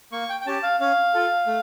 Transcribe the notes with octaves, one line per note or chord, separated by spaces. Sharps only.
A#3 C#6
G5
G5
C#4 G4 A5
F5
C#4 F5
F4 A4
A3